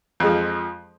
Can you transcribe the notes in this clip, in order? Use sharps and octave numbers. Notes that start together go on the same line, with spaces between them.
F2 F3 G#3